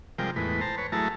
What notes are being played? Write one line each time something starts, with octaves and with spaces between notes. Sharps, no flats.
C3 F3 G3 G#3 A#4 G5
E2 A2 G#3 B4
C5 A5 A#5
B4 C#5
F#3 A3 E4 G#4 A5 A#5